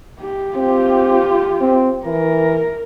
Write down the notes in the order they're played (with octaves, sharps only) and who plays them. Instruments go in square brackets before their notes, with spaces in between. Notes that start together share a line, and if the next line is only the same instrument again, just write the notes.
[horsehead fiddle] G4
[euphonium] C4 [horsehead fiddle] F4 G4
[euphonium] C4
[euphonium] E3 [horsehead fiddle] A#4